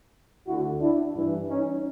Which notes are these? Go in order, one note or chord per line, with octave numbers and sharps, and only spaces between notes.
D2 D3 E4 F#4
D4 E4
G2 E3 D4 E4
C#4 D#4